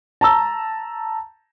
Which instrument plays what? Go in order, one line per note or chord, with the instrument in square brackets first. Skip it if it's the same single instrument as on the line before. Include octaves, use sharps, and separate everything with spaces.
[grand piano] A5 A#5 E6